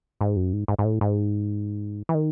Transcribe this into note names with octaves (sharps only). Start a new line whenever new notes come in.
G#2
F#2
G#2
G#2
G#2
A2
G#2
E3
D#3